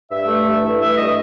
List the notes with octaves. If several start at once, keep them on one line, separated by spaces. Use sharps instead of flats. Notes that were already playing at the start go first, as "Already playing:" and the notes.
G2 E5
A3
G2
E3
A3 E5
G2 D#5